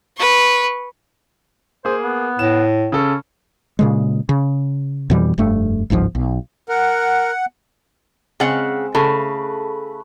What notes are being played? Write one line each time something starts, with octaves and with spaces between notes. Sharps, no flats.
B4 C#6
A#3 G#4 C5
B3
A2 E7
C#3 C#4 A4
A#2 C#3 G#3
C#3
F2 B2 E3 G3
F1 G2 A3
G1 C#2 G#2 F3
B1
A#4 F#5
C#3 G#3 C4 F#5 E6
C#3 A3 B4